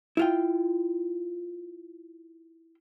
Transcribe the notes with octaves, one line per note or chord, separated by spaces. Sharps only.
E4 F4 G5